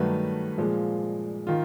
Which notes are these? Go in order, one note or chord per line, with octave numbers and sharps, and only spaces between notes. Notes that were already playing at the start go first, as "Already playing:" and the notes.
Already playing: G2 D#3 F#3 A3 B4
A#2 F3 G#3
D#3 F4